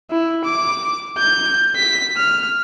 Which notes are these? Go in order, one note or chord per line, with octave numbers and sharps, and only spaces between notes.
E4
D6
G6
B6
F6